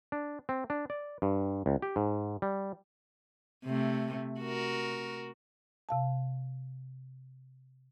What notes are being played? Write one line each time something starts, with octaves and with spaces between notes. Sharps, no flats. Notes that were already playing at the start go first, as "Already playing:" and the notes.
D4
C4
D4
D5
G2
C#2
G4
G#2
G3
C3 A3
F#4 A#4
C3 F5 A5